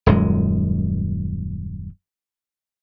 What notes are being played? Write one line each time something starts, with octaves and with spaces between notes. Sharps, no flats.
D#1 F#2 G#3